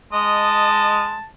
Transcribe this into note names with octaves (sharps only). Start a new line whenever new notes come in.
G#3 D#5 A5